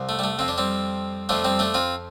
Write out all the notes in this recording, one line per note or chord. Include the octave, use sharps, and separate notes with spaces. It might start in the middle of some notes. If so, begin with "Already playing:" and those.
Already playing: C2 C3 F3
A3
G3
A3
F2 F3 C4
D4
G3 C4
F2 F3 A3 D4
G3 C4
A3 D4
C4 F4